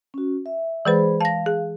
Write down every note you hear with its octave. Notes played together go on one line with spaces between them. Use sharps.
C#4 F#4
E5
E3 G#3 G#4 B4 C5 B5
F5 A5 A#6
G#4